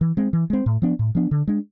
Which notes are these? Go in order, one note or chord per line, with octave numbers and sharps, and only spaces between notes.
E3
G#3 C4
E3
G#3 C4
A2
F3 B3 D4
A2
F3 B3 D4
D3
G#3 D4